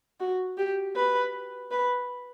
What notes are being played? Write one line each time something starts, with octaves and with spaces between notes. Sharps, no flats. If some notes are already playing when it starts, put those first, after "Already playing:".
F#4
G4
B4
B4